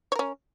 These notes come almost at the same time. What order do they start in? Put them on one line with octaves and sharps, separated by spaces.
C#5 A#4 C#4